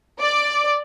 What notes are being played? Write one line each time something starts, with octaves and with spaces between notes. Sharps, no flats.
D5